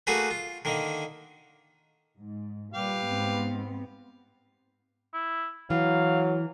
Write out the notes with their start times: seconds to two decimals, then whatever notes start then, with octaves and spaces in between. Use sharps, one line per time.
0.07 A3 A#3 F#4 G#4 B4
0.30 F4
0.65 D3 D#3 A#3
2.19 G#2
2.74 A#2 G3 G4 B4 F5
3.06 G#2 B3 C4
5.14 E4
5.70 E3 F#3 F5